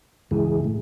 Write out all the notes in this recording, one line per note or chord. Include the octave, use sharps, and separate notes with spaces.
C#2 G2 E3 G#3
A2